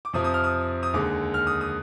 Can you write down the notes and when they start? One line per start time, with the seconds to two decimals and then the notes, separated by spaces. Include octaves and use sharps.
0.05 D6
0.13 F2 C3 F3 D#6
0.24 D#6
0.34 F6
0.44 D#6
0.83 D#6
0.93 D#2 D3 G#3 D6
1.34 F6
1.47 D#6
1.61 D#6